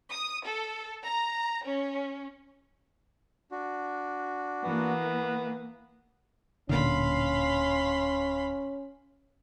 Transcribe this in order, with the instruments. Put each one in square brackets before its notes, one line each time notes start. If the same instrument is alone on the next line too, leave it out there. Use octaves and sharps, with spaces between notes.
[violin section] D#6
A4
A#5
C#4
[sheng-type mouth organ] D4 F#4
[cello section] E3 A#3 [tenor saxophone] B3
[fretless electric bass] D1 A#2 D3 [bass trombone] C#4 [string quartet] F5 B5 C6